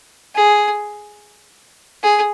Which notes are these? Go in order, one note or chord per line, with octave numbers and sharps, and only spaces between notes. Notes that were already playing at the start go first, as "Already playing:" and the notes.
G#4
G#4